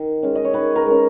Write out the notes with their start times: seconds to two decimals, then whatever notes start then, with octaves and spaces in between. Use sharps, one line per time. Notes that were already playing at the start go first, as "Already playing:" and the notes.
Already playing: D#3
0.23 G#3 C#4
0.35 D#5
0.45 C#5
0.54 D#3 B4
0.75 A#4
0.85 G#3 C#4